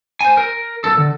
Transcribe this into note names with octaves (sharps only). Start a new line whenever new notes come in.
C5 G#5
A#4
B1 A4
D3